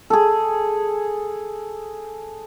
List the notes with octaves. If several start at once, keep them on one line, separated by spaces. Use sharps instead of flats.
G#4 A4